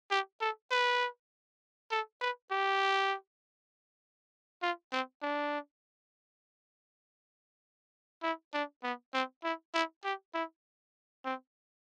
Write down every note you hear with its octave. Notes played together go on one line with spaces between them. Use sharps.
G4
A4
B4
A4
B4
G4
F4
C4
D4
E4
D4
B3
C4
E4
E4
G4
E4
C4